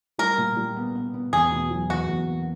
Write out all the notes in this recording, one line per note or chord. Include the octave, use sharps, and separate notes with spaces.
G3 A#4
A#2
G3
B3
B3
B3
E2 G#4
B2
F#3
E2 F#4
E2
A#3